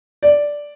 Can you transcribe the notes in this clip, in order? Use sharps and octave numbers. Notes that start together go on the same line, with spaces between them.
D5